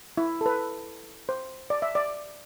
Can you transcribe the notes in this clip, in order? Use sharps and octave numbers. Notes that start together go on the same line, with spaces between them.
E4
A4
B4
C5
D5
E5
D5